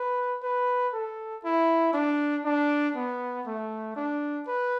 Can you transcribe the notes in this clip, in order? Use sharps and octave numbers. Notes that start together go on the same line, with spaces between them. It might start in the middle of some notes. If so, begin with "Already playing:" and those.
Already playing: B4
B4
A4
E4
D4
D4
B3
A3
D4
B4